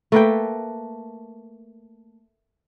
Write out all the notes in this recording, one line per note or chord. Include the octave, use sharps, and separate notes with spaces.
A3 A#3 B4 G5